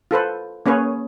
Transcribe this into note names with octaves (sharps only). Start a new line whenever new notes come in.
F4 A4 B4 C5
A#3 C#4 G#4 B4 C#5